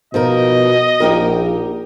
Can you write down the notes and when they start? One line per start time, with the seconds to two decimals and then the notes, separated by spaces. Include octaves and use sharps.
0.14 B2 F3 D#4 A#4 D#5
1.00 A#1 D#4 G4 A#4